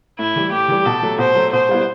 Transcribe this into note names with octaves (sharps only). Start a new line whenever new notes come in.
A2 E4
E3 G3
A2 G4
E3 G3
B2 A4
F#3 A3
B2 C5
F#3 A3
B2 C5
G3 B3 E4